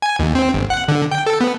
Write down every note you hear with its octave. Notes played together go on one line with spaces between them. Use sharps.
G#5
D#2
C4
G1
F#5
D3
G5
A4
B3